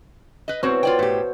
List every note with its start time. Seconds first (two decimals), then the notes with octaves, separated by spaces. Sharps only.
0.48 B4 D#5
0.63 B2 C4 F#4 C5 C#5
0.83 F4 D5 G5
0.99 A2 G4